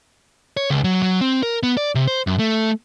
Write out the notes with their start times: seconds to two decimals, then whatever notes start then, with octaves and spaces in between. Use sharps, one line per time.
0.57 C#5
0.70 C#2
0.84 F#3
1.03 F#3
1.21 C4
1.43 A#4
1.63 B3
1.77 D5
1.95 C3
2.07 C5
2.27 F#2
2.39 A3